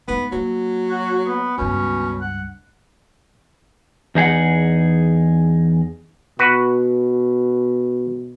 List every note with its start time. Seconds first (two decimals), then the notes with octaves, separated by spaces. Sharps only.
0.08 G#2 A3 B3
0.33 F#3 A#3 C4
0.89 F#4
1.26 B3
1.58 C#2 G2 B2 C#4
2.21 F#5
4.15 E2 D#4 G#4 F#5
6.39 B2 F#4 B4